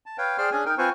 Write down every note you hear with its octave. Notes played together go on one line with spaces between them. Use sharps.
A5
B4 C#5 F5 G5
G#4 C5 D5 G5 C6 F6
C#4 D4 G#4 G#5
D#4 A#4 G5
C4 F4 B4 C5 G#5 C#6